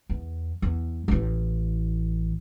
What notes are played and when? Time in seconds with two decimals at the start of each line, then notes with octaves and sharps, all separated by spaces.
0.09 E2
0.62 E2
1.08 A1 E3